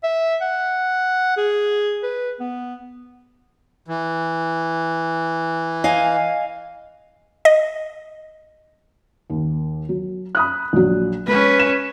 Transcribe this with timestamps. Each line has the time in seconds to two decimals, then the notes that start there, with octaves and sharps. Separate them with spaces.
0.03 E5
0.41 F#5
1.37 G#4
2.03 B4
2.40 B3
3.87 E3
5.84 D#5 F5 G#5
7.45 D#5
9.30 D#2
9.89 F#3
10.35 B5 D#6 F#6
10.73 A#1 F#3
11.27 G#3 C#4 B4
11.59 E7